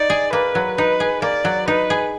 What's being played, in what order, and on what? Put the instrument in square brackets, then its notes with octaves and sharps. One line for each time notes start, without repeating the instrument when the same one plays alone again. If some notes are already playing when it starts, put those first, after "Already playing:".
Already playing: [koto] D#4 [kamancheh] D5
[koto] G#4
[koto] A#3 [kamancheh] B4
[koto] F#3
[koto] D#4 [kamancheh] B4
[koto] G#4
[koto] A#3 [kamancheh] D5
[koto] F#3
[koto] D#4 [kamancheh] B4
[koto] G#4